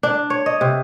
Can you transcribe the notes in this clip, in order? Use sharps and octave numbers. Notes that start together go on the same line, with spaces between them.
D4
C#5
D#5
C3